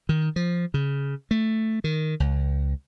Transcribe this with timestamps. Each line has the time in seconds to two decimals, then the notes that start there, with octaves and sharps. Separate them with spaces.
0.09 D#3
0.36 F3
0.74 C#3
1.31 A3
1.84 D#3
2.20 C#2